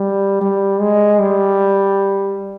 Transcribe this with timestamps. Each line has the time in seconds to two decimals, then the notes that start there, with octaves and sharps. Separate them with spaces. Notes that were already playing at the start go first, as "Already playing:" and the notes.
Already playing: G3
0.41 G3
0.80 G#3
1.19 G3